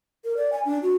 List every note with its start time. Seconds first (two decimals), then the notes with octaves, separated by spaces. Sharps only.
0.25 A#4
0.37 D5
0.52 G#5
0.65 D4
0.83 F#4